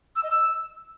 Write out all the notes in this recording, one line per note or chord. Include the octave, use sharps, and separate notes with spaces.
E6
D#5
E6